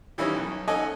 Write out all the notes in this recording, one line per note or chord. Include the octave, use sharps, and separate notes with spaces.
D#3 E3 G3 C#4 D#4
B1
C#4 D#4 A4 D#5 F#5 G#5